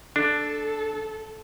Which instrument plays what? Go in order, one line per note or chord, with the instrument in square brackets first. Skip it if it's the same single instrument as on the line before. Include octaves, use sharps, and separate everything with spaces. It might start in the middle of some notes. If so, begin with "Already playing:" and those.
[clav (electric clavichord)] D4 [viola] A4